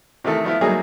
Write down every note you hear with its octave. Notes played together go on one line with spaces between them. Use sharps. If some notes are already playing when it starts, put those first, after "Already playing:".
C3 D#3 E3 A3 A4 A#4
F3 A3 B3 E4 F4
F#3 G3 A3 A#3 D#4 G#4